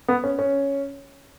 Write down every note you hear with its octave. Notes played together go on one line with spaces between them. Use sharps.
B3
C#4
C#4